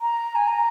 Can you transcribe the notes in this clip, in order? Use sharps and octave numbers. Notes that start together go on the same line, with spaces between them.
A#5
G#5
A#5